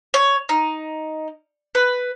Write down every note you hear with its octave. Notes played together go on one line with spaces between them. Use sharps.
C#5
D#4
B4